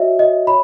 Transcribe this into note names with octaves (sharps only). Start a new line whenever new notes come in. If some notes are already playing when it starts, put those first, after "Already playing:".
Already playing: F#4 C#5 D#5 E5
D#5
C#5 B5